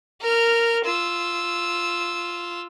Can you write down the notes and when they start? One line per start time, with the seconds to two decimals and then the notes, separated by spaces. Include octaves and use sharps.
0.20 A#4 F6
0.86 F4 E6